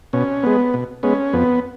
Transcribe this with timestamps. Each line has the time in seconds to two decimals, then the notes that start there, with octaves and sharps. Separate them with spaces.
0.13 B2 C#4
0.43 G#3 B3
0.74 B2
1.03 G#3 B3 C#4
1.33 F2 B3